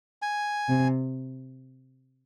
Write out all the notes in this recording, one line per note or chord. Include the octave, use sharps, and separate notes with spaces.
G#5
C3